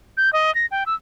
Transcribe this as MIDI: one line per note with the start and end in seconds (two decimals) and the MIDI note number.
0.17 0.32 91
0.33 0.53 75
0.55 0.66 94
0.71 0.84 79
0.86 0.94 88